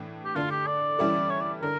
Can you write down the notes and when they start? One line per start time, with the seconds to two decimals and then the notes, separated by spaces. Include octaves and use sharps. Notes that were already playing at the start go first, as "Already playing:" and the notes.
Already playing: A2 E3 D4
0.25 G4
0.35 D3 A3 D4 F4
0.51 G4
0.67 D5
0.99 E3 G3 C#4 E4 A4
1.30 C#5
1.41 D5
1.62 D3 A#4